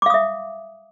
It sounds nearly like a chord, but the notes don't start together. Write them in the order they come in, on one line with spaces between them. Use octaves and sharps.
D6 F5 D#6 E5